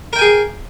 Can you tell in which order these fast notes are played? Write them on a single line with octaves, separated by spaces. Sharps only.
A#4 G5 G#5 G#4